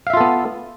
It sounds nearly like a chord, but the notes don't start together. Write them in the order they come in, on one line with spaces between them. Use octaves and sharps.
F5 E5 F4 A4 B3